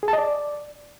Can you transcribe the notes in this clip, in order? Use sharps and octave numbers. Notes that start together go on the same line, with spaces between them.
G#4
A5
D#5
D5